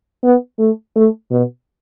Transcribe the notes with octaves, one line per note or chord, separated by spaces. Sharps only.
B3
A3
A3
B2